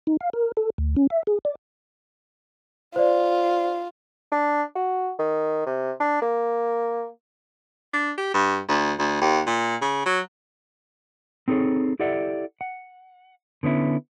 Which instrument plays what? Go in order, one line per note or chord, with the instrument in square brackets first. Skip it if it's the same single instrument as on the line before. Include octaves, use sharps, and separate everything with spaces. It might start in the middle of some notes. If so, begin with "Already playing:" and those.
[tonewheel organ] D#4
F5
A#4
A4
D2
C#4
E5
G#4
D5
[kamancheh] F4 [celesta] C5 D5
[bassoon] D4
F#4
D#3
C3
D4
A#3
[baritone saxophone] D4
G4
G2
D2
D2
D#2
A#2
C#3
F#3
[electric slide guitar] C4 D#4 G#4 A4 C#5
E4 G4 A4 D5 E5 F#5
F#5
D3 B3 C#4 E4